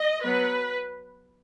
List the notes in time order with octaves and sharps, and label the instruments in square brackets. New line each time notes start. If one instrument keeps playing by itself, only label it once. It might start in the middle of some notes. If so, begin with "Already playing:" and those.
Already playing: [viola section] D#5
F#3 B3 B4